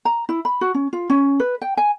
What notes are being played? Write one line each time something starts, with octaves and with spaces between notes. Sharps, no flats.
A#5
E4
B5
F#4
C#4
F4
C#4
B4
G5
G#5